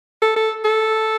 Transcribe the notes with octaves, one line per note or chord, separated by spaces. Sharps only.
A4
A4
A4